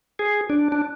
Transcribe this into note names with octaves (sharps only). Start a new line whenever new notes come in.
G#4
D4
D4